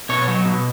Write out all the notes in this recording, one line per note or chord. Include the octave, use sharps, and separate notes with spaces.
B2 C#5
F#3
B2